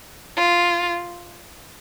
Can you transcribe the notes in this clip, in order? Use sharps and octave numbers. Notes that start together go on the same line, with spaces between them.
F4